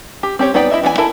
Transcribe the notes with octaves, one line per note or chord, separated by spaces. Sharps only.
G4
C4 G4 C#5
B3 D#4 B4 D5 G5
E4 D#5 E5
E3 B3 F#4 G#5
E4 A4 A#4 G#5